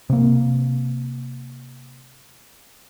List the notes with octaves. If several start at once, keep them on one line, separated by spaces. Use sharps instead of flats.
C3 A#3